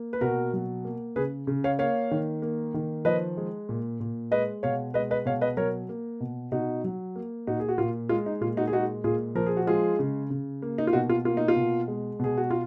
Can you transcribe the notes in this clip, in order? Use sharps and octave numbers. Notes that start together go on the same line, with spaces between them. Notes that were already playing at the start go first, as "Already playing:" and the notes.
Already playing: A#3
B4
B2 F#4 A#4
F#3
A#3
C#3 G#4 B4
C#3
C#5 F5
A#3 C#5 F5
D#3
A#3
D#3
F3 B4 D#5
G#3
A#2
A#2
G#3 B4 D#5
B2 C#5 F5
G#3 B4 D#5
B4 D#5
B2 C#5 F5
B4 D#5
F#3 A#4 C#5
A#3
B2
B2 D#4 F#4
F#3
A#3
A#2 D#4 F#4
G#4
F#4
A#2 F4
G#3 F4
D#4
A#2 F4
D#4 F#4
G#4
G#3 D#4 F#4
A#2 F4 G#4
F3 A#4
G#4
F#4
G#3 F4 G#4
C#3
C#3
A#3
D#4
F4
B2 D#4 F#4
F4
A#3 F4
D#4
F4
B2
G#3
B2 G#4
F#4
F4